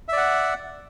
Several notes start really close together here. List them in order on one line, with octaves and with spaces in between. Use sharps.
E5 D5 F#5